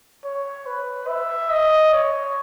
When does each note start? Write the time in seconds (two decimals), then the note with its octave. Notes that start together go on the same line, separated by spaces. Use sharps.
0.24 C#5
0.66 B4
1.08 E5
1.51 D#5
1.93 C#5